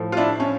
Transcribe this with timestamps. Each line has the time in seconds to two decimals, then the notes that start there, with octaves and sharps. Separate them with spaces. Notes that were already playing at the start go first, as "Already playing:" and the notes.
Already playing: A2 F3
0.12 F4
0.17 D4 E4
0.40 C#4